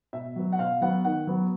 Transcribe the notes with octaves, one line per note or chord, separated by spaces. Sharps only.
B2 E5
F#3 B3
F#5
B2 F5
F#3 B3 F#5
D#3 F#5
F#3 B3